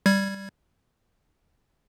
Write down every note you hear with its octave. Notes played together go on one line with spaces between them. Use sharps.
G3 G#6